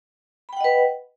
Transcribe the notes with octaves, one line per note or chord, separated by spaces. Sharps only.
B4 D#5 F#5 G5 B5